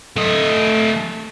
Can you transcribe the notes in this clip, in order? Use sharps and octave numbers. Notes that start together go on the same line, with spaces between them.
A3 D#5